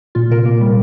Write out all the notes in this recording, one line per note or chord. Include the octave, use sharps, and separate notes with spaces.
A#2 F4
C3 A#4
A#3
G3